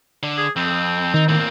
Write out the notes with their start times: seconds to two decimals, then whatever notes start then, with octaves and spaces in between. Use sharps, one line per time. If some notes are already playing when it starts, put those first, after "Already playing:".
0.23 D3
0.38 G#4
0.56 F2 C4
1.14 D#3 D#4
1.29 A2 A#3 C4